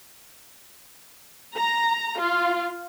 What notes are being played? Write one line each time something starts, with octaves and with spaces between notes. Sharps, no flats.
A#5
F4